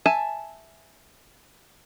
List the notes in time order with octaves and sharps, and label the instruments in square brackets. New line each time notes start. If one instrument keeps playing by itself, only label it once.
[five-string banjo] E5 G#5 A5